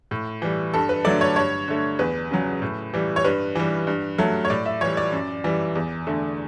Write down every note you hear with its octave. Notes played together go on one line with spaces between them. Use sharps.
A2
E3 G3
G2 A4
B4
D3 F#3 A3 D5
C#5
G2 C#5
D3 A3
E2 B4
C#3 F#3
A2
E3 G3
C#5
G2 B4
E3 G3
G2
F#3 A3
C#5
A2 D5
E5
E3 G3 C#5
D5
F#2
E3 G3
E2
D3 A3